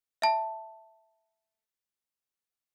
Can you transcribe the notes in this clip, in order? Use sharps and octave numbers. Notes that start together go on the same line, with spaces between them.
E5 A5